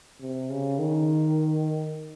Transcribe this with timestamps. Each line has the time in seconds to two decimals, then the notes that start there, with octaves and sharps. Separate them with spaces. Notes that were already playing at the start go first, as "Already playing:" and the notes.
0.20 C3
0.50 C#3
0.79 D#3